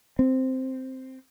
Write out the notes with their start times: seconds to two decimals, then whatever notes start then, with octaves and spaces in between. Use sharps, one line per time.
0.19 C4